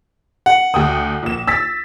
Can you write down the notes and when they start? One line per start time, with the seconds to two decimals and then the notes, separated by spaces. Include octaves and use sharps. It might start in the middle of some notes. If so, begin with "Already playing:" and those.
0.46 F#5
0.74 D2 G5 D#6
1.23 A#1 E7
1.47 E6 A6 B6